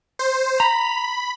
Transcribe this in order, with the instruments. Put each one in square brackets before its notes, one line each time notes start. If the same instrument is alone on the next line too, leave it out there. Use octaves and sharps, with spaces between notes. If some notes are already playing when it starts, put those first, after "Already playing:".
[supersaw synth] C5
[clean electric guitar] A#5 [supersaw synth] B5